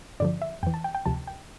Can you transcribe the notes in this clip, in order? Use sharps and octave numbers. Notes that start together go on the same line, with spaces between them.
G2 D3 F3 D5
E5
F2 E3 G5
A5
G5
G5
D2 C3 F3 A5
G5